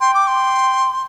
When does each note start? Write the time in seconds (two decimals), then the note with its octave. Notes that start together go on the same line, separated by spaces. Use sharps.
0.01 G5 C6
0.14 D6
0.28 C6